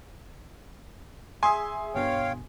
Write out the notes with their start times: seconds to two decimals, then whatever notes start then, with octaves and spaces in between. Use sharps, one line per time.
1.43 G#4 E5 G#5 C6 D#6
1.95 G1 B2 D3 C#5 F5 G5